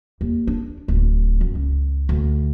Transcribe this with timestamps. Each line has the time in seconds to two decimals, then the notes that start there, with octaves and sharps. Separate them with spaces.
0.21 D#2
0.47 D4
0.88 D1
1.41 F#2
1.55 C#2
2.09 D2